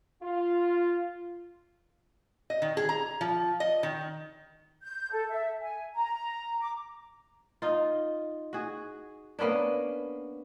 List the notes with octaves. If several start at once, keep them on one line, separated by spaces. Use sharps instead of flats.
F4
D#5
D#3
G#4
A#5
F3
D#5
D#3
G6
A4
E5
G#5
A#5
D6
D#4 F4
F#4 G#4
A#3 B3 C#4 D4